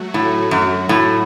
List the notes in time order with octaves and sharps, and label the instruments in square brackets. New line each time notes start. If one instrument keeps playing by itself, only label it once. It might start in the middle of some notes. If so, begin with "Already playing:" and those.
Already playing: [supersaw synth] F#3 A3 F#4
[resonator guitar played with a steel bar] A2
F#2
A2